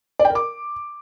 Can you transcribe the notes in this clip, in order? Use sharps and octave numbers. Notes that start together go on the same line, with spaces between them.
D5
G5
A#4
D6